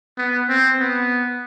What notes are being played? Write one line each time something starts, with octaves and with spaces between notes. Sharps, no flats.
B3
C4
B3